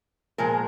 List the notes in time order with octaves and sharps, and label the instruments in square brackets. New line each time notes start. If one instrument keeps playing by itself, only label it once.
[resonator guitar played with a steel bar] A#2 F3 G#3 A#4